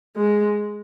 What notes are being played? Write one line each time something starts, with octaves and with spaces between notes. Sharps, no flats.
G#3